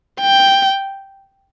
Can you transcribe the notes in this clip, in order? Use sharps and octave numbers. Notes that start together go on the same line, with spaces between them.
G5